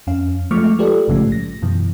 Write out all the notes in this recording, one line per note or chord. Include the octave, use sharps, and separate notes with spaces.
F2 C#4 F5
F3 G#3 A3 C#6 D6 F6
F4 G4 A4 B4 D5
A#1 G#2 C#3 F3 A3
A#6
F#2 B2 E3